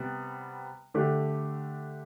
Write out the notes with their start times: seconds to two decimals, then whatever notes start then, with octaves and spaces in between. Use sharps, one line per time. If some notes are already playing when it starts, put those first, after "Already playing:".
Already playing: C3 G3 B3
0.94 D3 A3 D4 G4